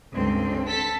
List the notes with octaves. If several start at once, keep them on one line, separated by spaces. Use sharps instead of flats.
C#2 G2 D3 C4
A4 A5 B6